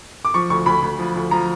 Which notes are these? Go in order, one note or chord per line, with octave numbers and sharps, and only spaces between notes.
D6
F3 C#6
D2 C#6
D2 B5
D2
F3
D2
F3 A#5